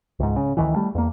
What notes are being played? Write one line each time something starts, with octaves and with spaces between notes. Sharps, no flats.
C#2 G#2
C#3
D2 D#3 E3
G3 A3
E2 A#3